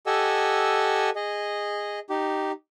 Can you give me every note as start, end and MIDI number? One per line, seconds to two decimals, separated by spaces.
0.06 1.10 67
0.06 1.10 69
0.06 1.10 75
0.06 1.10 78
0.06 1.10 80
0.06 1.10 88
1.16 1.99 68
1.16 1.99 75
2.10 2.52 63
2.10 2.52 67